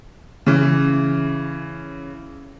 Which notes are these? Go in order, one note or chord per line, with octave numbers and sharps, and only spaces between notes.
C#3 E3